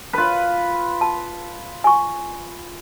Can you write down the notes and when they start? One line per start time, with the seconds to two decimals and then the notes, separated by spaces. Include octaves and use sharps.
0.13 F4 B4
1.01 A5
1.84 G#5 C#6